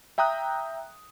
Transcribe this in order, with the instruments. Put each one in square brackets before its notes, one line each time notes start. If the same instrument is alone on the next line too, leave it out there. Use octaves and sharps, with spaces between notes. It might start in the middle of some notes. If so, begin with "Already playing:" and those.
[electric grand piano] E5 G5 A#5 D#6 F#6